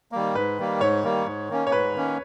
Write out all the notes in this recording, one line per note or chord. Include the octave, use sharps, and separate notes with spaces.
D#3 G3 A#3
G#2 B4
D#3 G3 A#3
G#2 C#5
D#3 G3 A#3
G#2
D#3 A#3 C#4
C#5
G#2 B4
D#3 A#3 C#4